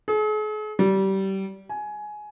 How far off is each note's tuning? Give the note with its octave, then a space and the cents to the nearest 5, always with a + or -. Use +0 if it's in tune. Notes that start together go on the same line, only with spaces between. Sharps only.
G#4 +45
G3 -25
G#5 +15